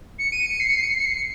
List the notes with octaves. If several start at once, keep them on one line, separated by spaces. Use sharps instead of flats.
C#7
D#7
C#7
C7
C#7
C7
C#7
C7
C#7
C7
C#7